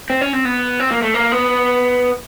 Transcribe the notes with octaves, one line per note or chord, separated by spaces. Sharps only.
C4
C#4
C4
B3
C4
A#3
A3
A#3
B3